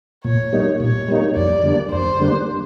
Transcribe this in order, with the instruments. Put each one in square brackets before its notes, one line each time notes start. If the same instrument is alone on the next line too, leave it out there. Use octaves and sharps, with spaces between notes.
[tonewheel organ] A#2 [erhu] C#5
[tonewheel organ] G3 A#3 D#4
[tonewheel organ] A#2 [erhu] C#5
[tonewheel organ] G3 A#3 D#4
[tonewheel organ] F2 [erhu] D5
[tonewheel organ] D3 G3 A#3 D4
[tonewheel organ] F2 [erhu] C5
[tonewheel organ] D3 G3 A#3 D4